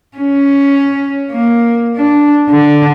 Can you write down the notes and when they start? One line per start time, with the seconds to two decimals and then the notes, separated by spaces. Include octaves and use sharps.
0.17 C#4
1.31 A#3
1.97 D4
2.49 D3